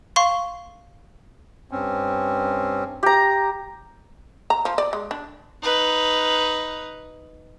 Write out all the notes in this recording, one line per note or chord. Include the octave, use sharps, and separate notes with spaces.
F5 C6 C#6
G2 C4 C#4
G4 A#5
A#5
F3
D5
G#3
D4
D#4 B4